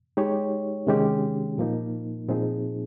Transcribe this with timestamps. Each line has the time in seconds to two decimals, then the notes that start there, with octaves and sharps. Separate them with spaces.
0.17 G#3 D#4 G4 C#5
0.87 C3 D#3 G#3 C#4 G4
1.58 A#2 F3 A#3 D#4
2.28 A#2 F3 C4 D#4 G#4